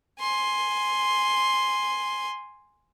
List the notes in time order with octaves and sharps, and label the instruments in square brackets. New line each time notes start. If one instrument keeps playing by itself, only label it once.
[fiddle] G#5 C6